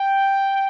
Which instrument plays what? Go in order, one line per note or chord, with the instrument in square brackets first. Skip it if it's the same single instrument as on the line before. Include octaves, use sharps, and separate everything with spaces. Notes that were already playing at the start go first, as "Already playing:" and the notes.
Already playing: [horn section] G5